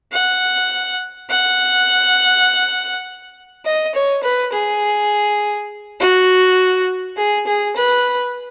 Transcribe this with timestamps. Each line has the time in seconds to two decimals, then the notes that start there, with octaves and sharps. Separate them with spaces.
0.12 F#5
1.30 F#5
3.65 D#5
3.95 C#5
4.23 B4
4.53 G#4
6.00 F#4
7.17 G#4
7.46 G#4
7.76 B4